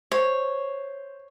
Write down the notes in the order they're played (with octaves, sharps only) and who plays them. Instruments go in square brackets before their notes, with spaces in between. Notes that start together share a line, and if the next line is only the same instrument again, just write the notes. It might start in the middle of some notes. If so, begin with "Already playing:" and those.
[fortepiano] C5 [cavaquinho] C#5